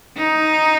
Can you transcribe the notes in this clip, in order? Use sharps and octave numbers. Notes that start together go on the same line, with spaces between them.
D#4